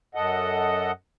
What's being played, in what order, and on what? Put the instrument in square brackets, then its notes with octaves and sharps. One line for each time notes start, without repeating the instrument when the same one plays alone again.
[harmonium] F#2 A4 D#5 F#5